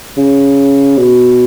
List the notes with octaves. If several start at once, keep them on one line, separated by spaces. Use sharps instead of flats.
C#3
B2